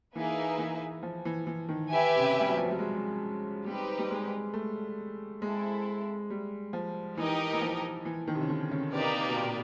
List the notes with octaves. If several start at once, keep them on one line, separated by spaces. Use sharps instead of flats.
E3 A#3 D#4 G#4 B4 E5
E3
F3
E3
E3
D#3
G4 B4 E5 G#5
C3
C#3
G3
F#3
F3
F#3
G3
G#3
G3 C4 D#4 G4 B4
G3
G#3
A3
G#3 C4 E4 A4
G3
F3
E3 D#4 G4 A#4 D#5
E3
F3
E3
D#3
C3
C#3
D3
C#3
C3 A#3 D#4 G4 B4 D5
B2
A#2